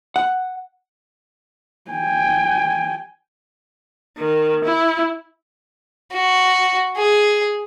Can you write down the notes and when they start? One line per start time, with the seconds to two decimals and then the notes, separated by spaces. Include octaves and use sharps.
0.16 F#5
1.91 G5 G#5
4.18 D#3
4.65 E4
6.13 F#4
6.97 G#4